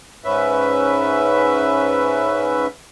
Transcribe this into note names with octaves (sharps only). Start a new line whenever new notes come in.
G#2 C#4 B4 E5